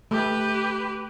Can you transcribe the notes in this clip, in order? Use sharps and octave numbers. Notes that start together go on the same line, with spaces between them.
A3 G4 B4